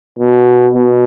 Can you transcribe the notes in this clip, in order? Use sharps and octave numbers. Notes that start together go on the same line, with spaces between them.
B2
B2